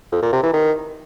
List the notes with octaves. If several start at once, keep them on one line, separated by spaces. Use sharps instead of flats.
F2
A#2
C3
E3
D#3